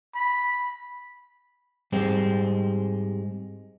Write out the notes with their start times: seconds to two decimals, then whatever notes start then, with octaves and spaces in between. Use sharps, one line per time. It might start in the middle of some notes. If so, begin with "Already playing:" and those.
0.15 B5
1.92 G#2 G3 G#3 C4